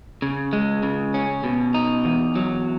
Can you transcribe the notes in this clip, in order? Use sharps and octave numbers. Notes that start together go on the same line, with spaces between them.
C#3
G#3
C#3
C#4
B2
D#4
E2
F#3